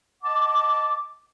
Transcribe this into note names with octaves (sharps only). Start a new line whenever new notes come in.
D#5 F#5 A5 D6